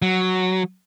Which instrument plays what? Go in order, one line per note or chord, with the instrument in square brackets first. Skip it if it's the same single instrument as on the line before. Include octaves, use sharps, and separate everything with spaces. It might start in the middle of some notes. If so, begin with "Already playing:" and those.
[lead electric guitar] F#3